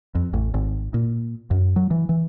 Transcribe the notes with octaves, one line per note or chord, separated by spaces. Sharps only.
F2
A1
G#1
A#2
F#2
F#3
E3
E3